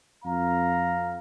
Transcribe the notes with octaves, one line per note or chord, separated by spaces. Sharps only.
F2 F5 A#5